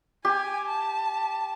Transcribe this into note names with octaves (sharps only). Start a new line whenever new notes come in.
G4 G#5
A5